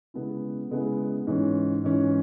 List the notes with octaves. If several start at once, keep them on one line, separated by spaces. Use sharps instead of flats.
C#3 G#3 B3 E4
C#3 G#3 B3 E4
G#2 E3 C#4
G#2 E3 C#4